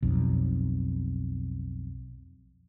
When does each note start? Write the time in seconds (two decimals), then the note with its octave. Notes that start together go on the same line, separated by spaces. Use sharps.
0.02 B1 F2